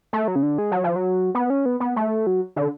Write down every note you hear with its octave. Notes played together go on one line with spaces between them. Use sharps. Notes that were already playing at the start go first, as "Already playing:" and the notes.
A3
F#3
C#3
D3
G#3
F#3
F3
F#3
B3
C#4
B3
B3
A3
F#3
D3